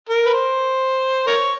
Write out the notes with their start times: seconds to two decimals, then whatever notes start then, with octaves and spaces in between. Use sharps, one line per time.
0.09 A#4
0.25 B4
0.33 C5
1.27 A#4 C#5